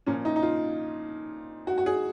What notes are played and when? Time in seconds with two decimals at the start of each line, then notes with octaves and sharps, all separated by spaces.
0.06 A#2 F3 C#4
0.25 D#4
0.36 D#4
0.42 F4
1.67 F#4
1.78 F#4
1.86 G#4